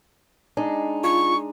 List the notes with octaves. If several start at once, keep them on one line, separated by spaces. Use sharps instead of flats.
G#3 D4 D#4
F4 C#6